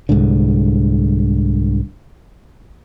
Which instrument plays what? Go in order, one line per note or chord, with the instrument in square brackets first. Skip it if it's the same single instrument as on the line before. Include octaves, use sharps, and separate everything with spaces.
[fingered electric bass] C2 G#2 D3